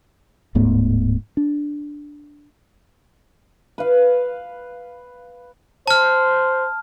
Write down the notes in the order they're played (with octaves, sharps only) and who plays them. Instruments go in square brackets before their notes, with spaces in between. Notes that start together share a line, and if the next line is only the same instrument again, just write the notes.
[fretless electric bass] D1 G#2 A3 B3
D4
[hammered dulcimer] B4 F5
[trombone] C5 [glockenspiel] A5 F6